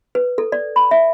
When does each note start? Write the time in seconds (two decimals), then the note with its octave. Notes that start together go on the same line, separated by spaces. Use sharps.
0.15 B4
0.38 A4
0.52 D5
0.76 B5
0.91 E5